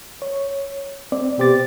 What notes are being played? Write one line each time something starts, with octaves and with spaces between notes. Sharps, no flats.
C#5
C4 D5
B2 B3 G4 C5 D6 A6